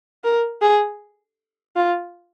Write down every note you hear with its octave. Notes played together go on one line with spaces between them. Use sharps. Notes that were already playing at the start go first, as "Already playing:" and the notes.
A#4
G#4
F4